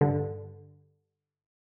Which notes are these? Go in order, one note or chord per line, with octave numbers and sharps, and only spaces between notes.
G2 D3